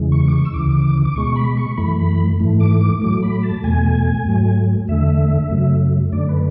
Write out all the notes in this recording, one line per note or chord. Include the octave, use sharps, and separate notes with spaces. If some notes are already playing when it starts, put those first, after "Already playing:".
Already playing: E2 C#3 E3 G#3
C#6
D6
C#6
E6
D2 C#3 E3 D6
D6
B2 G#3 C#6
B5
C#6
F#2 E3 A3 B5
G#2 E3 A3
D6
D6
A2 F#3 A3 D6
B5
A5
E2 B2 A3 G#5
G#2 F#3 A3
E2 D3 A3 E5
F#2 C#3 F#3 A3
F#2 D3 A3 D5
B4